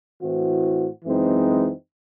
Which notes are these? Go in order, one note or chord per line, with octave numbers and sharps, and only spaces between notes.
A2 E3 C4 F#4
F#2 E3 G#3 C4 D#4